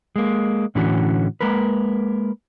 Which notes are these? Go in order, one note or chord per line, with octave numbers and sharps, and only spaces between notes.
G#3 A#3
A2 D3 E3 C#4 F#4
G#3 A#3 A#4 B4